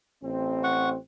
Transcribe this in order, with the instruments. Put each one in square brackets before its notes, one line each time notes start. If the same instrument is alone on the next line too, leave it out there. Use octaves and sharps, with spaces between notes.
[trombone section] A1 C4
[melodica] F#5 C#6